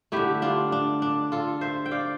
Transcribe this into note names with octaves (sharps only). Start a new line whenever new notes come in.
D3 A3 E4 G4
D4 F4
D4
D4
F4 A4
C5 E5
G5
D5 F5